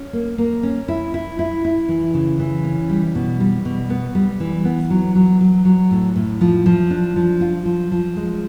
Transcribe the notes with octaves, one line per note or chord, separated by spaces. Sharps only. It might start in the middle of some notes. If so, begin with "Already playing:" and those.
Already playing: C#4
A#3
A#3
C#4
E4
E4
E4
E4
E3
C#3
E3
C#4
G3
B2
G3
B2
B3
G3
E3
B3
F#3
F#3
F#3
F#3
A2
A2
F3
F3
D4
F3
F4
F3
F3
G#3